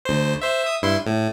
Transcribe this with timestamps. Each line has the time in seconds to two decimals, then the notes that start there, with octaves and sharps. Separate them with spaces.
0.05 D2 C5
0.42 C5 E5
0.63 E5 D#6
0.82 G2 E4 C6
1.06 A2